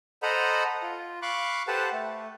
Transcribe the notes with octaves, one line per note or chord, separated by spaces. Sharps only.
A4 C5 D#5 F#5 A#5 B5
F4
F5 B5 C#6 D6 F#6
G4 A4 B4 C5 F#5 A5
A3